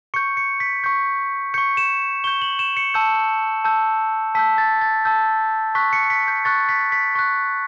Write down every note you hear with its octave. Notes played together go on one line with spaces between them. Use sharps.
C#6 G6 C#7
C#7
B6
C#6 G6
C#6 G6 C#7
E7
C#6 G6 G7
F#7
E7
C#7
A5 E6 G6
A5 E6 G6
A5 E6 G6 B6
A6
A6
A5 E6 G6
C#6 F#6 B6
C#7
B6
G6
C#6 F#6 A6
B6
B6
C#6 F#6